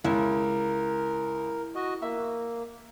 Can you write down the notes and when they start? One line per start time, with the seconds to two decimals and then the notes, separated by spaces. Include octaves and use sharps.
0.04 C#2 E4 A#4
1.75 F#4 D#5
2.02 A#3 E5